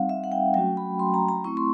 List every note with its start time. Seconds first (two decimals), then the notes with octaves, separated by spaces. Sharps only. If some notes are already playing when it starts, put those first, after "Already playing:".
Already playing: G3 C4 D#4 F5 F#5
0.09 E5
0.24 F#5
0.32 G5
0.54 F#3 A3 C#4 F#4 G5
0.77 B5
0.99 C6
1.14 A#5
1.29 A#5
1.44 A3 C4 E4 C#6
1.57 C6